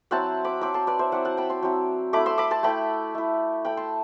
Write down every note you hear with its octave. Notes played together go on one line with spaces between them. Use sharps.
F#3 C4 E4 F#5 A5
B5 D6
F#3 C4 E4 B5 D6
A5 C6
B4 D5
C5 E5
F#3 C4 E4 D5 F#5
F#5 A5
G5 B5
A5 C6
F#3 C4 E4
A3 E4 B5 D6
C6 E6
B5 D6
A5 C6
A3 E4 G5 B5
A3 E4
A3 E4 G5 B5
A5 C6